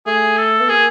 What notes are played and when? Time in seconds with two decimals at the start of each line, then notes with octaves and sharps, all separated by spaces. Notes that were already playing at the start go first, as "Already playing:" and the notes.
0.06 A3 G#4
0.38 A4
0.60 B3
0.68 A#3 G#4